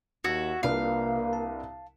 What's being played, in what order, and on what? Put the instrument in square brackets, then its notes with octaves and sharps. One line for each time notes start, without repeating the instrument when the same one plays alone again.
[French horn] D#2 [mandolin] F#4 E5 [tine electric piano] G#6
[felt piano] C2 D4 B4 [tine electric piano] C3 F4 [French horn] A#3 [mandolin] F5
[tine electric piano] A5